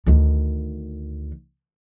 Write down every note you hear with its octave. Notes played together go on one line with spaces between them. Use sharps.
D2 D#3